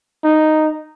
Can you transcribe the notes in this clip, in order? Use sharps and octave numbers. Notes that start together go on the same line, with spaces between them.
D#4